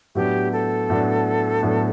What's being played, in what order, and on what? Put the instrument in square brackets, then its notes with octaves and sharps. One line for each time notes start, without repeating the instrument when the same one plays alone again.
[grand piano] A2 F#3 B3 D4 [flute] G4
[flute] A4
[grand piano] A2 F#3 B3 D4
A2 F#3 B3 D4